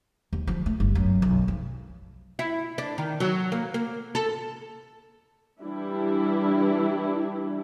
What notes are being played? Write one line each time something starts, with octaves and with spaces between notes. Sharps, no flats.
D#2
F3
A3
G1
F#2
B1
F3
E4
D4
D#3
F#3
A#3
A#3
A4
E3 G3 D4 E4